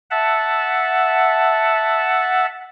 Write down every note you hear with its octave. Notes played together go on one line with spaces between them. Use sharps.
E5 F#5 A5